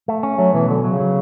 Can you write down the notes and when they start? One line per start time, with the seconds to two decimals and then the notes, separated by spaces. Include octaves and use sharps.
0.08 A3
0.23 C#4
0.38 F#3 A3
0.53 B2 E3
0.68 D3 F#3
0.84 C#3 F#3
1.00 F#3